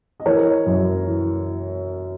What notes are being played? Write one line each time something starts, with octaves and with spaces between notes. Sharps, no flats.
D#5
E3 A#4 C#5
F#2
E3